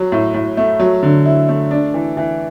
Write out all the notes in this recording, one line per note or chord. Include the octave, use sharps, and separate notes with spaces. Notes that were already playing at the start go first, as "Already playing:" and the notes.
Already playing: F#3
A2
A2
A3
F#3
D3
E4
A3
D4
E3
E3